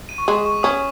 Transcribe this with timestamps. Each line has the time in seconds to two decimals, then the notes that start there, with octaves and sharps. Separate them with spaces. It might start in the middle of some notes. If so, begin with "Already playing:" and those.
0.09 D#7
0.18 C#6
0.28 G#3 D#6
0.46 C#6
0.63 C#4 D#6